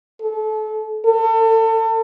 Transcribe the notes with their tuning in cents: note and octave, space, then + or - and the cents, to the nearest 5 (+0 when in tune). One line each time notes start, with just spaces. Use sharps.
A4 -30
A4 +35